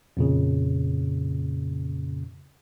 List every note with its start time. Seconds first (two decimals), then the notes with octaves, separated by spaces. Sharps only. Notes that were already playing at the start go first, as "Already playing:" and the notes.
0.17 F2 A#2 C#3